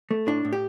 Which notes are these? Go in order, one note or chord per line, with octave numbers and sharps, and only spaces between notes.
A3
A2 D4
A2
G4